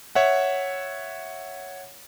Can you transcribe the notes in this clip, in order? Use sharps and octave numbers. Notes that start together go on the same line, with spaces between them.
C#5 E5 F#5